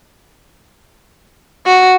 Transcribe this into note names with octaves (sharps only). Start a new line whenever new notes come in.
F#4